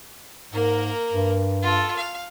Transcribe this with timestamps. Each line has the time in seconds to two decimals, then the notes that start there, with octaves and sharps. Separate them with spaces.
0.52 G#2 A#3 A#4
1.13 G2
1.62 F4 A4
1.96 F5